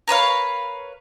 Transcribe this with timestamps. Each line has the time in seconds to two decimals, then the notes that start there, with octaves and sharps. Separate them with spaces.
0.07 A#4 B4 C#5 F5